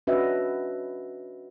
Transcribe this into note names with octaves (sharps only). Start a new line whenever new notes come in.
C#4 D4 F#4 B4 D#5 E5